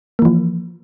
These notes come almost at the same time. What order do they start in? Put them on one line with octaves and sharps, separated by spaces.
A#3 E3 F3